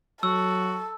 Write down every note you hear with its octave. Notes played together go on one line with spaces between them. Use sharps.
F#3 F#4 A4 E6